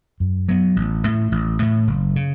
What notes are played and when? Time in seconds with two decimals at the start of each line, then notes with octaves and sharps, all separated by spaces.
0.20 F#2
0.48 F#3 B3
0.76 A1
1.04 A2 A3
1.32 A1
1.60 A2 A3
1.87 F#1
2.16 C#3